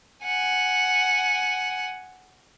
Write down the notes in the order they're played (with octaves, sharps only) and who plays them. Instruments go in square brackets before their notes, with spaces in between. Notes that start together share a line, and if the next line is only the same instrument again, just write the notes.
[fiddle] F#5 G#5